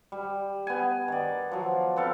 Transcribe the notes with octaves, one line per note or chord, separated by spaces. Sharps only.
G3
B3 G#5
D#3 D5
F3 F#3
B3 C4 A4 F5